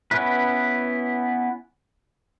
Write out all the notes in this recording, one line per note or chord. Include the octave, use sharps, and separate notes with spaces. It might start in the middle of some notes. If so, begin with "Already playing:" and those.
B3 C#4 E4 B4